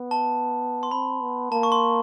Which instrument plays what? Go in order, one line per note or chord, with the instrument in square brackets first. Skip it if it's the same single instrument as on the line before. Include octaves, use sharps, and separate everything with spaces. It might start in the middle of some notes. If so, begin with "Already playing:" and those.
Already playing: [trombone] B3
[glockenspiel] A5
C6
[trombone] C4 [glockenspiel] B5
[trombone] B3
[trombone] A#3 [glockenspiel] A5
[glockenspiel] C#6
C6